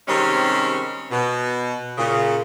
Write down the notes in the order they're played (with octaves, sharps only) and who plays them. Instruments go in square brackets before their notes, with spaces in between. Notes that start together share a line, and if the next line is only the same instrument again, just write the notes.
[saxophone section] C3 D#3 G3 G#3 C4 C#4
B2
A#2 C#3